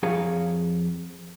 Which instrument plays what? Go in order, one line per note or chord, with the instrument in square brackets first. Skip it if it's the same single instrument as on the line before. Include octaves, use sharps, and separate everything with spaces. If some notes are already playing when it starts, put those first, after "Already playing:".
[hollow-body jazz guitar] F2 G#4 C#5 F5 A#5